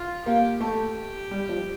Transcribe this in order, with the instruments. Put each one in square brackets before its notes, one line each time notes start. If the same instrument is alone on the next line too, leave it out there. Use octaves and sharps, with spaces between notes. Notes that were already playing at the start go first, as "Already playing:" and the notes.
Already playing: [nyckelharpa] F4
[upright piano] A#3 [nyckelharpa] G4
[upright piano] A3 [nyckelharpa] G4
[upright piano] G3
F3